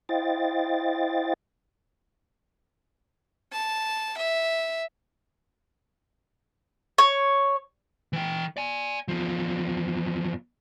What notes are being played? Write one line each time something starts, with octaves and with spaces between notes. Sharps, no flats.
E4 C5 D#5 F5 G5 A6
A5
E5
C#5
E3 G5
D5 G#5
E2 F3